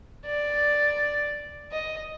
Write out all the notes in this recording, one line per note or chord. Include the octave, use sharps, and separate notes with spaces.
D5
D#5